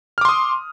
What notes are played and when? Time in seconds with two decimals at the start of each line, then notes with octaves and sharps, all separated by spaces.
0.18 F6
0.21 D6
0.25 C6
0.29 D#6